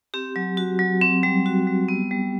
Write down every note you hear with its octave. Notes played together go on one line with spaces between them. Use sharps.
C4 G4
F#3
F#4
F#3
C4
G3
F#4
G3
B3
G3